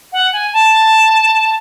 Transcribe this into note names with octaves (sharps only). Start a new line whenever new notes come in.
F#5
G#5
A5